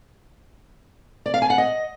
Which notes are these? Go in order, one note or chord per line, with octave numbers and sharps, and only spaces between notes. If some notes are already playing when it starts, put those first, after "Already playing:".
D5
F5
G#5
F#5
D#5